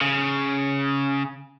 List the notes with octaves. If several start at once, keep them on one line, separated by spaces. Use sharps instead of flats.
C#3